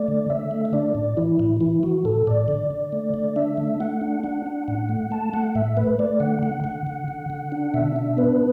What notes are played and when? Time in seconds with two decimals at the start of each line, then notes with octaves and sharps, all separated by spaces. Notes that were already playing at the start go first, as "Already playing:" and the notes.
Already playing: A3 D5
0.08 D3
0.30 D3 E5
0.51 A3
0.65 E5
0.73 D4 D5
0.95 A2
1.17 E3 E4
1.39 A2
1.61 E3 E4
1.83 E3 F#4
2.05 A2 A4
2.27 A2 D5
2.48 D3
2.71 D3
2.92 A3
3.14 D3
3.36 D4 E5
3.57 A3
3.80 A3 F#5
4.01 D4
4.24 D4 F#5
4.46 D4
4.68 A2 F#5
4.89 A3
5.11 A3 A5
5.33 A3 F#5
5.55 A2 E5
5.77 A3 B4
5.99 A3 D5
6.20 D3 F#5
6.43 D3 F#5
6.64 D3 F#5
6.87 D3
7.08 D3
7.30 D3
7.52 D4
7.74 B2 E5
7.96 D4
8.17 B3 B4